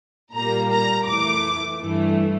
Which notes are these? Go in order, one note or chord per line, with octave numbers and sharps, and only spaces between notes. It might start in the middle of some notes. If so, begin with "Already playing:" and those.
A#2 G3 A#3 A#5
A#5
F2 E3 A3 D6
G2 E3 A3